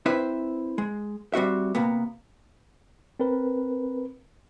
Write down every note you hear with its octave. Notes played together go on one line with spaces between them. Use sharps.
C4 E4 B4 C5 E5
G#3
G3 C4 F#4 E5
C3 A#3 B3
C4 A#4 B4